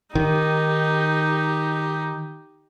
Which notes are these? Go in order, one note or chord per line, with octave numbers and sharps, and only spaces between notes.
D#3 D#4 G4